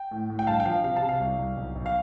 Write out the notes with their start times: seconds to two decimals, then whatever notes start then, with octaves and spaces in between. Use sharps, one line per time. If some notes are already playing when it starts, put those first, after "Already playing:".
Already playing: G5
0.11 A2
0.30 A2
0.39 G5
0.47 G2 F5 A5
0.60 G5
0.65 F3 F5
0.84 C3 F5
0.96 F5 A5
1.02 C3
1.09 F5
1.20 C2
1.39 C2
1.56 B1
1.75 B1
1.86 F5